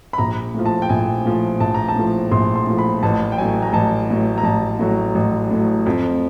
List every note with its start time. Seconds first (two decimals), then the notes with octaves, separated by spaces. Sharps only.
0.13 B5
0.18 A#1 A#5
0.54 A2 F3
0.65 A5
0.82 G5
0.89 A#1 G#5
1.25 A2 F3
1.60 A#1 A5
1.75 A#5
1.88 A5
1.96 A2 F3
2.32 A#1 C6
2.55 C6
2.67 A2 F3
2.79 B5
3.03 A1 A5
3.32 G5
3.37 A2 F#3 G#5
3.62 A#5
3.73 A1 A5
4.09 A2 F#3
4.38 A#5
4.43 A1 A5
4.79 A2 F#3
5.15 A1
5.51 A2 F#3
5.86 F2